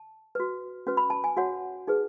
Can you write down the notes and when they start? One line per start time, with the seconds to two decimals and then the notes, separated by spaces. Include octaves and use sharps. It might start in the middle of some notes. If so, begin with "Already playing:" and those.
Already playing: A5
0.35 F#4 B4
0.87 C#4 F#4 B4
0.97 B5
1.10 A5
1.24 G#5
1.37 F#4 C#5 F#5
1.87 D#4 G#4 B4